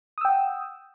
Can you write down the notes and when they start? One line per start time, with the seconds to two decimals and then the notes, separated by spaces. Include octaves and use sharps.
0.18 D#6
0.21 E6
0.25 G5
0.28 F#5